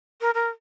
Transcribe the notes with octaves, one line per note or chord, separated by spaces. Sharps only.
A#4
A#4